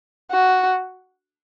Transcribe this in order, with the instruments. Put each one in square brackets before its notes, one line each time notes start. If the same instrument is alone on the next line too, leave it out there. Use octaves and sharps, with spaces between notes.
[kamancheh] F#4